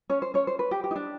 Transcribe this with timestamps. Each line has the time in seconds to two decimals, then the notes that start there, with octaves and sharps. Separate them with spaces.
0.09 C#4 C#5
0.22 C5
0.34 C#4 C#5
0.47 C5
0.59 B4
0.71 G4
0.84 G4
0.91 D#4
0.96 D4